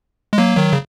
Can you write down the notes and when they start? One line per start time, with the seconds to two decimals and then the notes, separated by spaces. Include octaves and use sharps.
0.33 G#3
0.38 F#3 A#3
0.57 D#3 F#3
0.73 C#3